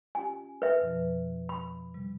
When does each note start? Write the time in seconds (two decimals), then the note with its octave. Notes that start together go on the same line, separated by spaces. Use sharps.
0.15 C#4 F4 G4 G#5
0.62 B4 E5
0.81 F2 B2 F3
1.49 B5
1.94 C3 G3